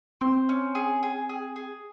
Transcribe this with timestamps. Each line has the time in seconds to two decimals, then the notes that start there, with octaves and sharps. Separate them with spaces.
0.21 C4 C5
0.49 C#4
0.75 G#4
1.03 G#4
1.29 G#4
1.56 G#4